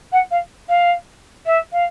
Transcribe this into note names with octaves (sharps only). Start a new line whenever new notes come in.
F#5
F5
F5
E5
F5